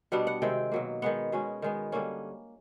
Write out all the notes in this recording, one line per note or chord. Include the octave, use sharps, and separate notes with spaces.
B2 G3 B3 D4 F#5
F#5
C3 D#3 G#3 C4 G5
B2 F#3 A#3
D#3 G#3 B3 F#5
B2 G#3 C#4
D#3 G#3 B3
D3 G3 A#3 C#4